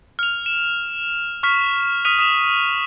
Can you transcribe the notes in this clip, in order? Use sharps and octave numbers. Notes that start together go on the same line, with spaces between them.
F6 F7
E7
C#6 F6 B6
D#6 F6 B6 D#7 F7
D#6 B6 E7 F7